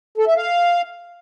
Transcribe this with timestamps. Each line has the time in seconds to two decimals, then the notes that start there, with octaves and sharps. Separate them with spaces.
0.18 A4
0.27 E5
0.37 F5